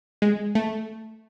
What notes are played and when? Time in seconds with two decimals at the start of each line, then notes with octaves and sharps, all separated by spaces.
0.22 G#3
0.55 A3